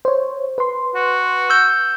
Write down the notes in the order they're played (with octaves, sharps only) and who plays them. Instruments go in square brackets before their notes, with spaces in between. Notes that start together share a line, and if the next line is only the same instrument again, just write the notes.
[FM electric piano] C5 C#5
B4 C6
[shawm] F#4
[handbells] E6 G6